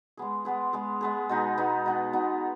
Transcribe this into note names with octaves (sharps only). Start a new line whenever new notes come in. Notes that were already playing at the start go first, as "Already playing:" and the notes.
G#3 B3 G#4
G#3 B3 G#4
G#3 B3 G#4
G#3 B3 G#4
B2 B3 D#4
B2 B3 D#4
B2 B3 D#4
B2 B3 D#4